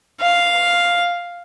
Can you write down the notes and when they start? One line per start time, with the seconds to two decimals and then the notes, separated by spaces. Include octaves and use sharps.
0.21 F5